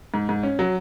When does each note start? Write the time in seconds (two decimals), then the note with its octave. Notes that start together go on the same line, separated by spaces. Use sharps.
0.14 G#2
0.29 G#2
0.43 C#4
0.59 F#3